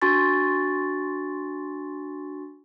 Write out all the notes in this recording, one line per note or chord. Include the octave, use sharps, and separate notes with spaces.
D4 F#4 G#5 C6 C#6 A6